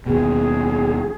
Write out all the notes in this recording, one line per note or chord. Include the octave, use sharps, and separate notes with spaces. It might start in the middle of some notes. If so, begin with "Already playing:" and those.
D#2 B2 G#4